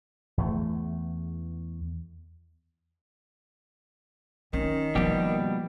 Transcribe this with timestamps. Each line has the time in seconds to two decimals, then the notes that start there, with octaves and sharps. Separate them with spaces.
0.38 E2 A3
4.53 D#3 C#4
4.95 B2 F3 G3 A#3 G4